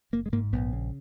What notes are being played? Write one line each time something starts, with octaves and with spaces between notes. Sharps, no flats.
F#1 A#3
G#3
G#2 A#3
A#1 B3
C#3